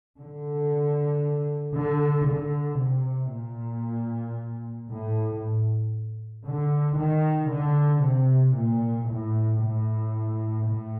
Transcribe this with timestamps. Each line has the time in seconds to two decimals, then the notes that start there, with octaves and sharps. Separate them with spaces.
0.18 D3
1.75 D3
2.28 D3
2.80 C3
3.32 A#2
4.89 A2
6.46 D3
6.98 D#3
7.51 D3
8.04 C3
8.56 A#2
9.08 A2
9.61 A2
10.65 A2